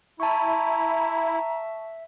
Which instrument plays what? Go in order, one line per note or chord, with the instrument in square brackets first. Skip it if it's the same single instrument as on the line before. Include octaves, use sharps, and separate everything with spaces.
[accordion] E4 [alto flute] E5 [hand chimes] A5 C#6 [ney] A#5